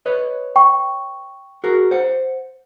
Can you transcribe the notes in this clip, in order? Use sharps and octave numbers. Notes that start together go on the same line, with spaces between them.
B4 C#5 D#5
G5 C#6
F#4 G#4 A#4
C5 F#5